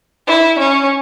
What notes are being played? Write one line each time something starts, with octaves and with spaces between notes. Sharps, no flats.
E4
C#4